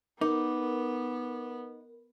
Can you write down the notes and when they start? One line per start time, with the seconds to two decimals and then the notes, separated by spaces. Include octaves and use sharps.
0.21 B3 D#4 A#4 D6